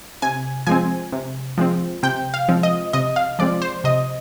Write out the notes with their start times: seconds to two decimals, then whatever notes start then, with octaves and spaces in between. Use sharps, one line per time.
0.22 C3 G#5
0.67 F3 G#3 C4 G#5
1.12 C3
1.58 F3 G#3 C4
2.03 C3 G5
2.34 F5
2.49 F3 G#3 C4
2.63 D#5
2.93 C3 D#5
3.16 F5
3.39 F3 G#3 C4 D5
3.62 C5
3.84 C3 D#5